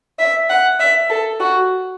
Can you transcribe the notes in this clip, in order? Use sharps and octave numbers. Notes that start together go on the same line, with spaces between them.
E5
F#5
E5
A4
F#4